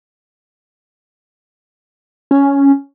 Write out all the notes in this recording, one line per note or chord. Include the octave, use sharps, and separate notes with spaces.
C#4